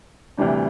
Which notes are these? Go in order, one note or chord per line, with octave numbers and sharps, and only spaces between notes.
D2 C3 E3 G3 D4